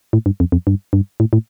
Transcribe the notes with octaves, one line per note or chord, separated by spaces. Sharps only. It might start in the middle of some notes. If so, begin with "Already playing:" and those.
A2
G2
F2
F2
G2
G2
A2
A2